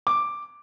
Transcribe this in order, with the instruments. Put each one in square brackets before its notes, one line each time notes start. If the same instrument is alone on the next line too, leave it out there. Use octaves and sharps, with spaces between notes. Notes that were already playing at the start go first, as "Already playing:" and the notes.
[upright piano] D6